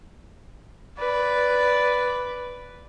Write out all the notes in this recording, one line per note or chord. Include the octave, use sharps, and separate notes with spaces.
B4 D5